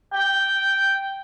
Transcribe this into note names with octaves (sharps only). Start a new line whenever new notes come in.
G5